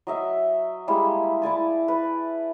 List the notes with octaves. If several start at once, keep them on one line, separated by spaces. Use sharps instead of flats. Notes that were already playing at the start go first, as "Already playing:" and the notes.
F#3 D#5 E5
G3 G#3 A#3 E4
E4 D5 G#5 A5
B4